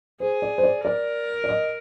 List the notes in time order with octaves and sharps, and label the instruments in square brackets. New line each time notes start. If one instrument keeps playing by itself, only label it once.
[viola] G#4 [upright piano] C5
[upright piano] D5
C5
D5
[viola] A#4 [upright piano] D5
[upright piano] D5
D#5